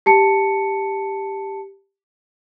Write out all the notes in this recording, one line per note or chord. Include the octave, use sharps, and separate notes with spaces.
G4 A5 C#7